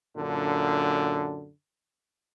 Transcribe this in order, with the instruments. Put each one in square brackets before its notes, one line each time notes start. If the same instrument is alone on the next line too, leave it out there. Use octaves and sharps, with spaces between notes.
[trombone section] F#2 A#2 D3